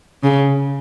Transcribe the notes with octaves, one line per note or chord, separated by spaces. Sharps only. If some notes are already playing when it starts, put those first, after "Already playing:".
C#3